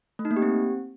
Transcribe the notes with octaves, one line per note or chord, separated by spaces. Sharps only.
A3
D#4
A#3
G4
C4